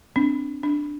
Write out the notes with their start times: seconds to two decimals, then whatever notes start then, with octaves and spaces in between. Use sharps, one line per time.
0.16 C4 D4
0.63 D4